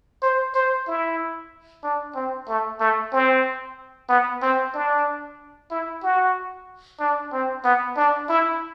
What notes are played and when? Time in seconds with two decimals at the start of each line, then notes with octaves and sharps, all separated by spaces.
0.22 C5
0.54 C5
0.87 E4
1.83 D4
2.15 C4
2.48 A3
2.80 A3
3.13 C4
4.09 B3
4.42 C4
4.74 D4
5.71 E4
6.03 F#4
7.00 D4
7.32 C4
7.64 B3
7.97 D4
8.29 E4